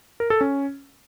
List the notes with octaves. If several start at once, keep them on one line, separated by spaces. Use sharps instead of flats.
A#4
A4
C#4